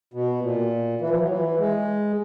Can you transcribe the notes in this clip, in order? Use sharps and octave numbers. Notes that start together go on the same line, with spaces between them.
B2
A#2
E3
F3
F#3
E3
G#3